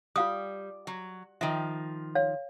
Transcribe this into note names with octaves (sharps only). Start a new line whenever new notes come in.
G3 F4 F5 D#6
F#3
D#3 F3 E5
C#5 F5